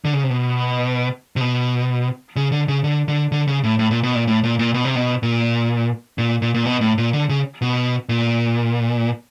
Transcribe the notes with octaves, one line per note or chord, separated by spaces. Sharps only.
D3
C#3
C3
B2
C3
B2
C#3
D3
C#3
D3
D3
D3
C#3
A2
A2
A#2
B2
A#2
A2
A#2
A#2
B2
C3
B2
A#2
A#2
A#2
A#2
B2
A2
A#2
D3
C#3
B2
A#2